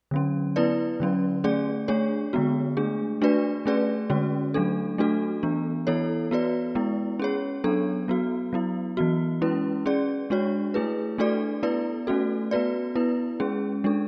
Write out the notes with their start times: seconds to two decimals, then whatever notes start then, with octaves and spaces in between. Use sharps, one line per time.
0.11 D3 F#3 C#4
0.56 B3 E4 B4 D5
1.00 D3 F#3 C#4
1.44 A3 C#4 G#4 D5
1.88 A3 D4 G#4 C#5
2.33 D3 G#3 B3 F#4
2.77 A3 D4 G#4
3.21 A3 D4 F#4 B4 D5
3.66 A3 C#4 G#4 B4 D5
4.10 D3 G#3 C#4 F#4
4.54 F#3 A3 D4 A4
4.98 A3 D4 F#4 A4
5.43 E3 B3 D4
5.87 E3 B3 E4 A4 C#5
6.31 B3 F#4 B4 D5
6.75 G#3 B3 E4
7.20 C#4 G#4 C#5
7.64 F#3 B3 D4 A4
8.08 F#3 B3 F#4
8.53 F#3 B3 E4
8.97 E3 B3 F#4
9.41 G#3 C#4 E4 B4
9.86 C#4 G#4 D5
10.30 G#3 D4 F#4 C#5
10.74 A3 E4 G#4 B4
11.18 A3 D4 F#4 A4 D5
11.63 B3 E4 B4 D5
12.07 A3 C#4 F#4 A4
12.51 B3 F#4 B4 D5
12.96 B3 E4 B4
13.40 G#3 C#4 G#4
13.84 G#3 D4 A4